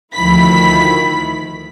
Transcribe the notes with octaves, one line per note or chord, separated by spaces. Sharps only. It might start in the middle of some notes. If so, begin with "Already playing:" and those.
D2 D#3 F3 E4 B5 B6